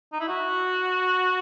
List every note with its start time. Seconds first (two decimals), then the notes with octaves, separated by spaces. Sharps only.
0.13 D#4
0.20 E4
0.28 F#4